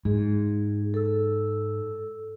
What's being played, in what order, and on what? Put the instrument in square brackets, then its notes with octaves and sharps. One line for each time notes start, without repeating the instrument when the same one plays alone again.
[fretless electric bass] G#2 [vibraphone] G#4
[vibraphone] A4 E6